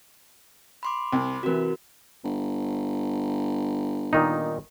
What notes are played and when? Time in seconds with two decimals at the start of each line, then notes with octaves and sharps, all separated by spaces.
0.83 B5 C6 D6
1.12 C2
1.43 C3 E3 F#4 A#4
2.24 G1
4.13 A#2 D#3 D#4